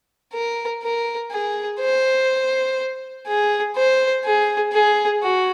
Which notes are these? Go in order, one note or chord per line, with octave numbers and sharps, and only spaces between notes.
A#4
A#4
G#4
C5
G#4
C5
G#4
G#4
F#4